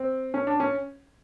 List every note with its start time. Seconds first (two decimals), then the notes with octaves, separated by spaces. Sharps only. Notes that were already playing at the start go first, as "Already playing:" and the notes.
Already playing: C4
0.34 C#4
0.47 D4
0.60 C#4